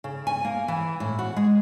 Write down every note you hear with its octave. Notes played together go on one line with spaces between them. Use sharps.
C#3
G#5
A#3
E3
A2
F#4
G#3